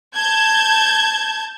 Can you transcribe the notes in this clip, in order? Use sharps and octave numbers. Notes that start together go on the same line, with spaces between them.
A5 G6 G#6